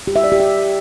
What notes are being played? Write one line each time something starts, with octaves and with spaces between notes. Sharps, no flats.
G4
E5
D5
G4
E5